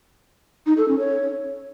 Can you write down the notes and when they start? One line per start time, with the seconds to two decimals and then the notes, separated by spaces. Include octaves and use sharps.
0.66 D#4
0.77 A4
0.88 C#4
0.99 C#5